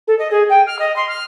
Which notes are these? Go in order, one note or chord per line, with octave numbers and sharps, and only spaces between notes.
A4
D#5
G#4
G5
F6
D#5
C6
F6